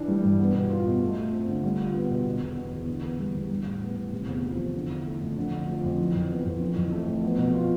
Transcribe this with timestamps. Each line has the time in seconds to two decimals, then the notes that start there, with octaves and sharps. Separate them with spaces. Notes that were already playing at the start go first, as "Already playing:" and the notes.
Already playing: E3 D4
0.08 G3
0.23 G2
0.40 B3
0.55 B2
0.70 F4
0.86 B2
1.02 A3
1.17 F4
1.32 C4
1.48 D3
1.64 G3
1.79 F4
1.95 B3
2.10 B2
2.25 B2
2.41 E2
2.57 B3
2.73 E2
2.88 D3
3.03 B3
3.19 G3
3.35 E2
3.51 G3
3.66 A2
3.81 B3
3.97 A2
4.12 C3
4.28 E2
4.44 F3
4.59 E2
4.75 D3
4.90 E4
5.05 A3
5.21 F2
5.37 D3
5.52 A3
5.68 F3
5.84 F2
5.98 E3
6.15 F2
6.30 B3
6.45 F2
6.61 E3
6.76 F2
6.92 A3
7.07 F2
7.23 B3
7.38 B2
7.54 F4